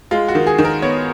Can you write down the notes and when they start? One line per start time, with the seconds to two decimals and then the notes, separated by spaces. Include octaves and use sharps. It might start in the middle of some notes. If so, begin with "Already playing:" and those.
0.11 G#3 F4
0.28 F#4
0.35 D#3
0.47 G#4
0.59 D#3
0.65 A#4
0.82 B3 C#5